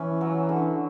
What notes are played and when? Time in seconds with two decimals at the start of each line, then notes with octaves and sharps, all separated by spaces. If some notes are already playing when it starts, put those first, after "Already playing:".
Already playing: E3 C#4
0.21 F#3
0.49 D3